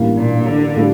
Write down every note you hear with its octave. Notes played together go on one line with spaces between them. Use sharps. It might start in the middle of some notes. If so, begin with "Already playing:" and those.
Already playing: A1 G2 E3 A#3
A#2
D3
A2 G3 D4 F4 A4